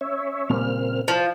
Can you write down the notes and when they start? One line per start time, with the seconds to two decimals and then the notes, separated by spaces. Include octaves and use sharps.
0.01 C#4 C#5 E5
0.49 A#2 C#3 G3 A#3 C4 F6
1.08 F3